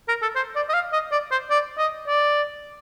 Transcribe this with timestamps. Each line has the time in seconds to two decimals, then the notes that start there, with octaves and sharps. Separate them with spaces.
0.08 A#4
0.22 A4
0.36 C5
0.55 D5
0.69 D#5
0.74 F5
0.93 D#5
1.12 D5
1.31 C5
1.50 D5
1.78 D#5
2.07 D5